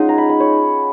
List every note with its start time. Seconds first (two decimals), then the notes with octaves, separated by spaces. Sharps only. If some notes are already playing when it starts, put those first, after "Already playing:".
Already playing: G#3 C#4 D#4 F4 F#5 G#5
0.09 A#5
0.18 B5
0.29 B5
0.40 C#5